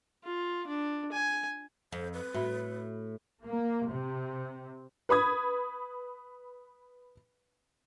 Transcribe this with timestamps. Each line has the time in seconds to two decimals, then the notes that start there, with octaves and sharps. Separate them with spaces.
0.24 F4
0.67 D4
1.12 G#5
1.92 F2 C5
2.13 B4
2.34 A2 F#4 E5 B5
3.46 A#3
3.89 C3
5.09 B4 B5 D#6 G#6